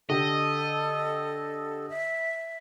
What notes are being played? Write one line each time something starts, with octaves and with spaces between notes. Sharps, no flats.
D3 G4 A4 D#5
E5